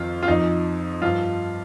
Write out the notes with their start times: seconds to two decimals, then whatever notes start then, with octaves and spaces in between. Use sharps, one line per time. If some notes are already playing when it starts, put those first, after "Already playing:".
Already playing: F2 D#3 F4
0.23 F4
0.28 F2 F3 D#4
1.02 G2 F3 F4